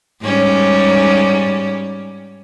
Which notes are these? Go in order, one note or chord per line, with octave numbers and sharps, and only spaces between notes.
G#2 G3 C#4